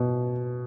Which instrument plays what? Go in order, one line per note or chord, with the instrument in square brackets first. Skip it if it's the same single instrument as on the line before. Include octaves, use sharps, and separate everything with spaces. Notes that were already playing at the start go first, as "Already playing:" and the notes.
Already playing: [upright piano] B2